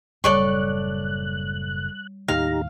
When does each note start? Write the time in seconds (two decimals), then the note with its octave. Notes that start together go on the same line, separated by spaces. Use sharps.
0.24 F#1 A2 G3 A4 C#5 D5 C#6 F#6
2.28 D#2 A2 D#3 D#4 G4 F5 A#5